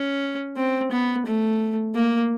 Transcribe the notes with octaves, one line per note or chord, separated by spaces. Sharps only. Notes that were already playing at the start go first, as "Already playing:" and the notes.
Already playing: C#4
C4
B3
A3
A#3